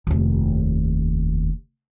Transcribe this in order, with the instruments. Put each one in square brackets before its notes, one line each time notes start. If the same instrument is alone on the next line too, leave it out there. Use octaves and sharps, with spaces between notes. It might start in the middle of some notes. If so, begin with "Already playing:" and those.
[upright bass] F1 D#2